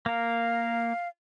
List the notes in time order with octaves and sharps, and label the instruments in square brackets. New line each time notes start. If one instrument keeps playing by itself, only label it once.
[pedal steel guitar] A#3 A#4 [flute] F5